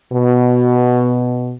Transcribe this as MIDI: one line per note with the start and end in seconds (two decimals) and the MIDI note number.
0.12 1.54 47